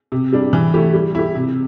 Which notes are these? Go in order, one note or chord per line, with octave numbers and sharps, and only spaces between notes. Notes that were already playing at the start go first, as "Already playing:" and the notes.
C3
G3 D4
E3
A3 E4 G4
G3
E4 G4
C3